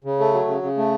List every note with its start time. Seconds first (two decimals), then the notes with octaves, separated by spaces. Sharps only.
0.04 C#3
0.19 A3
0.33 F#3
0.47 C#3
0.62 C#3
0.77 A3